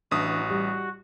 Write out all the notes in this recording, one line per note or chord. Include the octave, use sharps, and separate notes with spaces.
A1 E3 D4 F#4 E5 D#6
G3 G4